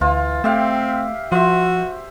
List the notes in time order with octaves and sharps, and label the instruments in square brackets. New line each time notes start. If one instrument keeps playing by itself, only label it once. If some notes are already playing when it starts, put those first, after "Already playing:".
[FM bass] D2 [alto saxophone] E3 [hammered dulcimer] F4
[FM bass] A3 [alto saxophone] C4 [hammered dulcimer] G4 E5 F5
[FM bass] F3 [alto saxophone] F#4 [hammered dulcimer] C5 E5